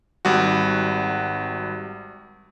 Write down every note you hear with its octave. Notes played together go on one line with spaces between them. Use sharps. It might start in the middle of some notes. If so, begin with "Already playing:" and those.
G#1 G3 F#4